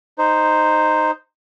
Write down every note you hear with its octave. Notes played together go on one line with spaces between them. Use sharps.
D#4 C5